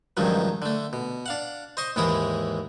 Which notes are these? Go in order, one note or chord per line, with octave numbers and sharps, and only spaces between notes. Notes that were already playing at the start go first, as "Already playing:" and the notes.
C#2 G2 D#3 F3 F#3
D3 A3
B2
D4 F5 F#5
C5 D#5 C6 C#6
D#2 G#2 E3 G#3 E4 D#6